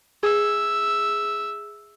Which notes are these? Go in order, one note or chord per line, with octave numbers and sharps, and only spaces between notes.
G#4 E5